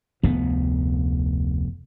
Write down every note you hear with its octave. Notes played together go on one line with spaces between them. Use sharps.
F1 D2 B3